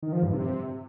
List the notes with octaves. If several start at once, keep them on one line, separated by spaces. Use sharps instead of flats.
D#3
F3
G2
C3